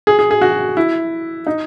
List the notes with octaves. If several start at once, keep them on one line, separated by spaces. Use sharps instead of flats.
G#4
G#4
G#4
F#4
E4
D#4